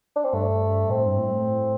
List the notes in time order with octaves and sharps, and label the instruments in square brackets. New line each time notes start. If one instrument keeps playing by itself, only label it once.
[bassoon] D4
C4
[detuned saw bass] G2 [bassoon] A3
[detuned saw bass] A2 [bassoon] C4
[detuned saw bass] G2
A2